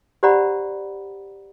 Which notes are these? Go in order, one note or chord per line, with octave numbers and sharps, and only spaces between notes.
G4 C5 D5 F#5 A#5 B5